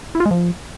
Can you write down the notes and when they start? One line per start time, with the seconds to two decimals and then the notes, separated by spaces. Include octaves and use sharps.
0.15 E4
0.20 F4
0.26 G#3
0.31 F3